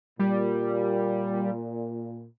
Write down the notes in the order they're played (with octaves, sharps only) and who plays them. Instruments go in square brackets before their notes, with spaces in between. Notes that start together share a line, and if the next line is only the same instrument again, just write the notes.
[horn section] A#2 [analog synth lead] G3